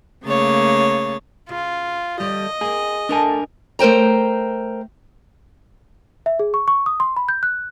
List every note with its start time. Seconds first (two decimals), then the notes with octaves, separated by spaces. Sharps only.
0.24 C#3 A3 A#3 G#4 C#5 A6
1.49 C#3 F4
2.20 E2 D3 G3 C#5 D#5
2.61 A#3 C4 G#4
3.09 A3 D4 A4 A#4 D5 G#5
3.79 A3 A#4 C5 G5 A#5
6.26 E5
6.39 G#4
6.54 C#6
6.68 C#6
6.86 D#6
7.00 C6
7.16 B5
7.29 G6
7.43 F#6